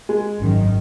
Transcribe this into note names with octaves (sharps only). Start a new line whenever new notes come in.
G#3
G#1 F#2 D#3